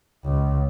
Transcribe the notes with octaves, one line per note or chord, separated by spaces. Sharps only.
C#2